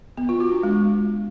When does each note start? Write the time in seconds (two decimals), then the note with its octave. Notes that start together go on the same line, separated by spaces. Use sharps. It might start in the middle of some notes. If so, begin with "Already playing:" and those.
0.17 B3
0.29 F4
0.40 F#4
0.52 D4
0.63 G#3